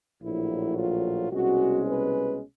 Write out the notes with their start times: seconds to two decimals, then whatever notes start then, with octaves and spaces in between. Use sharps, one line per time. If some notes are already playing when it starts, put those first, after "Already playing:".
0.21 A#1 A2 F#3 E4
0.77 F4
1.31 C2 B2 G#3 C#4 F#4
1.86 B4